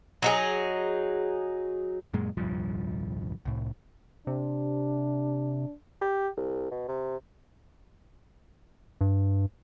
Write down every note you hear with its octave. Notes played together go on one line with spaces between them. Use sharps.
F#3 D#4 G#4
F#2 A#2 G#3
D#1 C2 G2 F3
C2 A2
C3 D4
G4
C2
B2
C3
G2